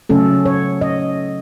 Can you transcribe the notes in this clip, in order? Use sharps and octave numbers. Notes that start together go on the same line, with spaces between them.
C#3 F#3 A3 C#4 A4
C#5
D#5